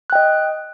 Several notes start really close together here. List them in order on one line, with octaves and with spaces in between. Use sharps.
F#6 G5 D#5